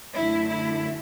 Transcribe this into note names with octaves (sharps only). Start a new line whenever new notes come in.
F#2 D3 A3 E4
E4